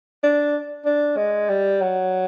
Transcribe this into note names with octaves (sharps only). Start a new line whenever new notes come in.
D4
D4
G#3
G3
F#3